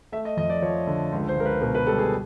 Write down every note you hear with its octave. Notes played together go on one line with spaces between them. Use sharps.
A3 E5
D#5
F2 D#5
D5
F3 C#5
D3
C#2
C5
C#2 A#4
B4
B2 A#4
B4
G3 A4
G#4